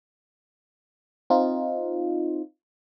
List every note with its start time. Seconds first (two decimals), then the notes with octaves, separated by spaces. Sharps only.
1.30 C4 D#4 F4